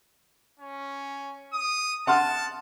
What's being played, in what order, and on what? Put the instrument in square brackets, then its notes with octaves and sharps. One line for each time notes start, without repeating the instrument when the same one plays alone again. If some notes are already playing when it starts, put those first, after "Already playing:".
[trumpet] C#4
D#6
[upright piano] F#5 C6 F6 [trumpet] A5